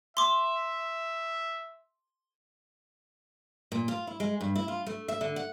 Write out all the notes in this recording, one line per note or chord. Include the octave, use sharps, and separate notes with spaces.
E5 C6 D6
A#2
F4
E4
G#3
G2
E4
F4
A3
E5
D3
F#5